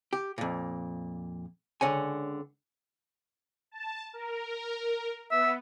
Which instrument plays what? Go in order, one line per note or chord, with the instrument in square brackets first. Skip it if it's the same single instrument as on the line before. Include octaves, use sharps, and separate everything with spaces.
[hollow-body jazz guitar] G4
F2 A#2
C#2 D3 C#5 G#5
[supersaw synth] A5
A#4
[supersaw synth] B3 [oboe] E5